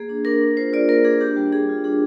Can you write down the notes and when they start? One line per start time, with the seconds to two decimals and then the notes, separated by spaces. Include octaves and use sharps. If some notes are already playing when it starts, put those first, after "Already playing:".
Already playing: A#3 G#4
0.09 D4
0.25 D4 A#4
0.41 D4
0.57 F4 C5
0.73 F4 D5
0.88 A#3 A#4
1.04 D4 G#4
1.21 D4 G4
1.36 G3
1.52 D4 G#4
1.69 F4
1.84 D4 G#4